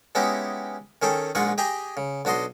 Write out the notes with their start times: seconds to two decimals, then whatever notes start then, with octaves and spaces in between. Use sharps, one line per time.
0.15 G#3 B3 C#4 D#4 E4 G4
1.02 D#3 C#4 G#4 A4 G5
1.35 A#1 G#2 G#3 F4 F#5 C#6
1.58 G4 G#4 D#5 G5 G#5 A#5
1.97 C#3
2.25 B1 D4 F#4 D#5 C6